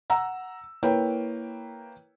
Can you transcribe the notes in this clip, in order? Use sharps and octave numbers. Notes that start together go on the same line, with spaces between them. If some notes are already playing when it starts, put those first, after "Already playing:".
F#5 A#5 E6
A#3 E4 B4 C#5 G5